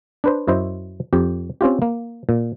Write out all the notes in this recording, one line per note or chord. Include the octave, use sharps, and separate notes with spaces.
D4 B4 C5
F#2 E4 C5 D#5
F2 G4
C4 C#4 F4 G4
A#3
A#2